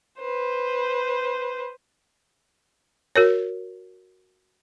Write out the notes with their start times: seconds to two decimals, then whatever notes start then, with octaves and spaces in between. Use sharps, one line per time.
0.20 B4 C5
3.16 F#4 A#4 C#5